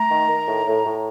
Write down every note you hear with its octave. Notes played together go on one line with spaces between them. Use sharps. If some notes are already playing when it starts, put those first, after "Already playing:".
Already playing: A3 A#5
D#3
D#3
A2
A2
A2